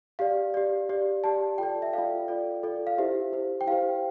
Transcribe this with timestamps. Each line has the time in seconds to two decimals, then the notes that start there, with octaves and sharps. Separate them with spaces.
0.19 G4 D5 F5
0.54 G4 D5
0.89 G4 D5
1.24 G4 D5 A5
1.58 F4 A4 D5 G5
1.82 E5
1.93 F4 A4 D5 F5
2.28 F4 A4 D5
2.63 F4 A4 D5
2.87 F5
2.98 E4 G4 C5 E5
3.33 E4 G4 C5
3.61 G5
3.67 E4 G4 C5 F5